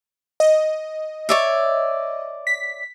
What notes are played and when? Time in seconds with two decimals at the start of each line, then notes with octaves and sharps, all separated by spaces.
0.40 D#5
1.29 C#5 D5 E5
2.47 B6